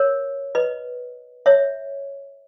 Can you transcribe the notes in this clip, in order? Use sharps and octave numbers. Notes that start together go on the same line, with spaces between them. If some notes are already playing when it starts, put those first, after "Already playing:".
Already playing: A#4 C#5
B4 D#5
C#5 E5